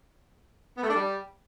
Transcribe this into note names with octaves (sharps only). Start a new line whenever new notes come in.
B3
A3
D4
G3